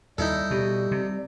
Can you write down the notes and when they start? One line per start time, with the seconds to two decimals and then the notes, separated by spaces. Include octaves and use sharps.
0.18 D#2 G3 D#4 E4 A4
0.51 B2 G4
0.91 C3